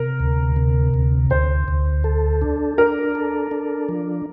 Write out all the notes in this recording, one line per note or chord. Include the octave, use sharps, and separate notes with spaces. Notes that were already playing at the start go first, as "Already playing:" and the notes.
Already playing: C3 A#4
D2
C3
D2
D2 C5
D2
A4
D4
D4 A#4
A4
D4
F3